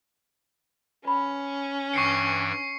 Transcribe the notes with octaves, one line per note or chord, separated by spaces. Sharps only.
C#4 B4 B5
G2 E3 G5 C#6 C7 C#7